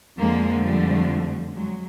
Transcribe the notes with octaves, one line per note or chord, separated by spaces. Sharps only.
F2 D3 F3 G#3 A#3
G3 A3
F#3 G#3